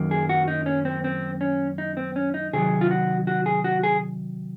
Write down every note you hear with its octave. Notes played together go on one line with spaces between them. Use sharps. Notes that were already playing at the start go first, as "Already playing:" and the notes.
Already playing: F#2 D#3 F#3 A#3
G#4
F#4
D#4
C#4
C4
C4
C#4
D#4
C4
C#4
D#4
C3 D#3 F#3 G#4
F4
F#4
F#4
G#4
F#4
G#4